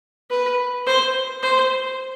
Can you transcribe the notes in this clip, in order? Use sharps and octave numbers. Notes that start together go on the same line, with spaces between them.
B4
C5
C5